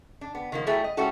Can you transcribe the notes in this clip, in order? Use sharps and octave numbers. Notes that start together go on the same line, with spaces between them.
D4
B3
D#3 F3 A#3
F#3 G3 A3 E4 G#4
D#5
G3 G#3 C#4 E4 F#4 A4